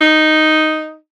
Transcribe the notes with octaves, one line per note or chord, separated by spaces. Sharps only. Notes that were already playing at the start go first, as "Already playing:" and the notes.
D#4